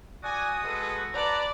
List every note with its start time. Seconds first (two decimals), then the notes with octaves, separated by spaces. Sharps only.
0.24 F#4 D5 G#5 D#6
0.64 G#3 A4 B4
1.14 B4 D5 A5 A#5